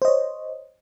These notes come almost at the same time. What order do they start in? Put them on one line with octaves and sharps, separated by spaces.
C5 D#5 C#5